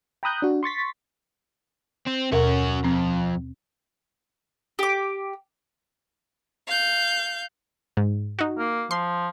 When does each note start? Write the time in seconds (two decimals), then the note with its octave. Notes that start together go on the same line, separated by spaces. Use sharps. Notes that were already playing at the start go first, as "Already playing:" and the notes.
0.23 G5 A#5 B5 D#6 F#6 G6
0.42 D4 F#4
0.63 C6 C#6 A6 B6
2.07 C4
2.32 D#2 B2 C#4 F#4 A#4
2.84 F2 C4
4.79 G4 D6
6.67 F5 G6
7.97 G#2
8.39 D#4 F#4
8.59 A#3
8.91 F3 C6